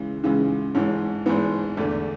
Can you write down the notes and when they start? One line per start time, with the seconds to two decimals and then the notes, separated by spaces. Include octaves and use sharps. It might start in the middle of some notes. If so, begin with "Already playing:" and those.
Already playing: C#2 C#3 E3
0.24 C#2 C#3 E3
0.75 G#1 G#2 E3 C#4
1.26 G#1 G#2 E3 B3
1.77 E2 D3 A3